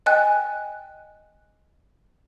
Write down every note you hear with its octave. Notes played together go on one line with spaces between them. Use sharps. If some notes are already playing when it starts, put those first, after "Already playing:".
D#5 G5 G#5 F#6